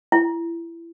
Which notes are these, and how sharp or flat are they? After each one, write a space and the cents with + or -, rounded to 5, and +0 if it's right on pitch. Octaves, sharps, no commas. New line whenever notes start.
E4 +25